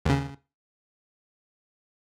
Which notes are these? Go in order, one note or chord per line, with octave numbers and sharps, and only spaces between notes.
D#2 C#3